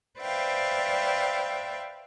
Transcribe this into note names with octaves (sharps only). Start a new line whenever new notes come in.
B4 C5 D5 E5 F5 G5